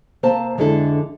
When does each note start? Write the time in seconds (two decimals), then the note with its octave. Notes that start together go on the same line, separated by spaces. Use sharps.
0.23 C3 A#3 C5 F5 A5
0.58 F2 D3 G#3 D4 E4 A4